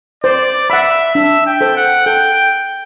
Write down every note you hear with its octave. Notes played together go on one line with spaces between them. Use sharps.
C5 D5
E5 F#5 B5
D4 E5
G5
A4 C5
F#5
A4 G5